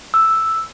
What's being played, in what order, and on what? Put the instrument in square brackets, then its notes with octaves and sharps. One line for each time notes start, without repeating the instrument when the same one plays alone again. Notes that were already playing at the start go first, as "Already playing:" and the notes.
[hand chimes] E6